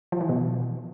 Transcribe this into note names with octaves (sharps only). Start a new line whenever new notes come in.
F3
E3
B2